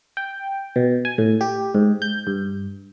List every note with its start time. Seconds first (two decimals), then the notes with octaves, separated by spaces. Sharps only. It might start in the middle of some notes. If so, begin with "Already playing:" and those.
0.17 G5
0.76 B2
1.05 G#5
1.18 A2
1.41 G4
1.75 G#2
2.02 G6
2.27 G2